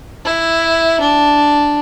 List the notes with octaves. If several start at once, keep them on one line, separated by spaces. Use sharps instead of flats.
E4
D4